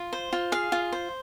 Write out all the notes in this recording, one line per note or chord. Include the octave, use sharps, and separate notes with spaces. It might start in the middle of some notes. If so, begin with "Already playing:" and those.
Already playing: F4
C5
F4
G#4 F5
F4
C5